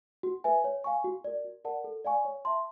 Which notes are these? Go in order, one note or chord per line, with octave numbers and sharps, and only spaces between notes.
F#4
B4 E5 G#5
C#5
F5 G#5 C#6
F#4
A#4 D5
F#4
A#4 D5 F#5 A5
A4
D5 F5 G#5 C#6
C#5
E5 A5 C6